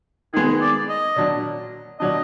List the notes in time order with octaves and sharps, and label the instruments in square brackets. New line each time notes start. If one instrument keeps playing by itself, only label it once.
[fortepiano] D#3 G#3 B3 [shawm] G#4
[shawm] D5
D#5
[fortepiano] A#2 F#3 D4
[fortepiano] A#2 F#3 D4 [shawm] D#5